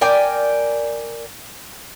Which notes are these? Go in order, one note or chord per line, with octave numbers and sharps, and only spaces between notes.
A#4 D5 G5 G#5